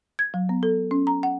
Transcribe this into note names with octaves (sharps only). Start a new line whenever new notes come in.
G#6
F#3
B3
A4
C#4
A#5
F#5